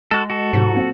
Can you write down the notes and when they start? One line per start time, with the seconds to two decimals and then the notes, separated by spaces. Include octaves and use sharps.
0.11 G#3 F#4 A4
0.30 F#4 A4
0.53 D2 G#2 C3 F#3
0.71 A#2 F#3 C4